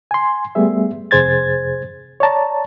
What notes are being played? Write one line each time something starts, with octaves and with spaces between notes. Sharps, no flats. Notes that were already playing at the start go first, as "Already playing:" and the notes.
G#5 C6
G3 A3 B3 G#4 E5
F2 C3 G#4 C5 G#6 A6
C#5 D5 A5 A#5